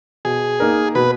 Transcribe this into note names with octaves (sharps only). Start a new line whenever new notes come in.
B2 G#4
A#3 D#4 A#4
B2 B4